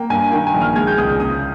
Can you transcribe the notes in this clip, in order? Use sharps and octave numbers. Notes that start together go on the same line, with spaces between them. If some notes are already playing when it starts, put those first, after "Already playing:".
Already playing: A#3 G5
G2 G#5
D#3 G5
G#5
A#1
F6
G#3 G#6
G6
C#2 D#6
C#3 D#6